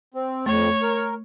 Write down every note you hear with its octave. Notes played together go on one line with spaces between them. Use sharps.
C4
F2 A3 C#5
A#4